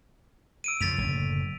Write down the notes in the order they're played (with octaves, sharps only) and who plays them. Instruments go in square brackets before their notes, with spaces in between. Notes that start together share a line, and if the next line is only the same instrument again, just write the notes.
[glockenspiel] E6 D7 D#7
[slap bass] F2 C#3 [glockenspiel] A6 B6 F7
[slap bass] F#1 A2 D3